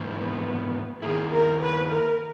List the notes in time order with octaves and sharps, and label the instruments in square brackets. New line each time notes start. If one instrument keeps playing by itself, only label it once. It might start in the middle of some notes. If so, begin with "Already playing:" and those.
Already playing: [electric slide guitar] G#2 E3 A#3
[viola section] B3
[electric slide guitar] D#3 A#3 E4 [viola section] G#4
[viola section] A#4
B4
A#4